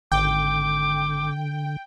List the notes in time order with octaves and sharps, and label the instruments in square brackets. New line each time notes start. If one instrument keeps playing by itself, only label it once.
[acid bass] G#1 [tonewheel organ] D3 [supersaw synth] G5 [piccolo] D6